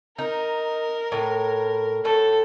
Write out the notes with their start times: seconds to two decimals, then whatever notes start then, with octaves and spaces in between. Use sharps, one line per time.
0.18 D#4 A#4
1.12 A2
2.05 A2 A4